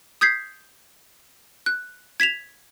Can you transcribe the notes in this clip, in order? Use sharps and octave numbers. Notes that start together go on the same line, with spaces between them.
D#6 G6 G#6 B6 C7
F#6
G#6 B6 E7 F7